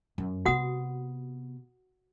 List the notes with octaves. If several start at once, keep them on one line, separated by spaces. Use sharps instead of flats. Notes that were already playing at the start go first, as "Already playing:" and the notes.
F#2
C3 B3 F#4 F#5 D#6